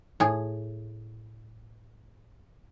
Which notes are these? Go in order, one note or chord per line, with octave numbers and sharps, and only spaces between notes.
A2 G#4